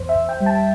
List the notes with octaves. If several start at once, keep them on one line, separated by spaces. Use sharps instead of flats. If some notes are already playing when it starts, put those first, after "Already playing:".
Already playing: E2 C5
E5
E2
G5
G3
A5